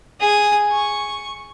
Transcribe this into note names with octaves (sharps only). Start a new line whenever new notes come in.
G#4 D#6
C#6